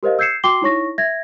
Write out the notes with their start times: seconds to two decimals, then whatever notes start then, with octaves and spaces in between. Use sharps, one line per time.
0.03 G4 A#4 C5 D#5 F5
0.19 E6 G6 G#6 C7 C#7 E7
0.44 F#4 G5 C6 D6 C7 G7
0.62 D#4 E4 C#5 C#6 A#6
0.98 E5 G#6 A#6